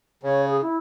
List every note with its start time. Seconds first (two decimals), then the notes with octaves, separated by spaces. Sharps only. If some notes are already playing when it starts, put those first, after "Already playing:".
0.23 C#3 C#5
0.47 G#4
0.61 E4